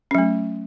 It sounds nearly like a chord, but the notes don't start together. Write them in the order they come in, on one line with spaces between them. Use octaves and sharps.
C#4 F#3 A3